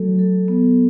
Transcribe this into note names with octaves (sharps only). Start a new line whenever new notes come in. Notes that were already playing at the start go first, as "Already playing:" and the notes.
Already playing: F#3 A3 A4
A4
B3